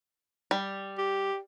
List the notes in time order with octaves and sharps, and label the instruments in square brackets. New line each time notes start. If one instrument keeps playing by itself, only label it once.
[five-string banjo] G3
[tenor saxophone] G4